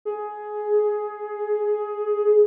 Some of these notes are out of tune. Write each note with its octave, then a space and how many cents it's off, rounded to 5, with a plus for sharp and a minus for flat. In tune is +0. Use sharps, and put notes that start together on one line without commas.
G#4 +15